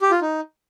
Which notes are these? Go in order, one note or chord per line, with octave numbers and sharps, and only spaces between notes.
G4
F4
D#4